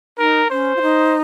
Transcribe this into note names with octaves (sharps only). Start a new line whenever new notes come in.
D#4 A#4
C#4 C5
F4
D#4